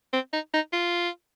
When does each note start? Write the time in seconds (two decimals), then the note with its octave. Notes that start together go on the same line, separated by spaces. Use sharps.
0.13 C4
0.33 D#4
0.54 D#4
0.73 F4